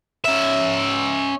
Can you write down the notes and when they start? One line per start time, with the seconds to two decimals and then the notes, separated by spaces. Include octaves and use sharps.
0.24 C#4 E5